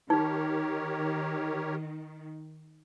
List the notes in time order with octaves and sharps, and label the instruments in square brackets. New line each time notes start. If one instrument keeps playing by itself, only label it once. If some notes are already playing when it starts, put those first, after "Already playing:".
[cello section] D#3 [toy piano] D#4 [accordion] G4 A#4 C#5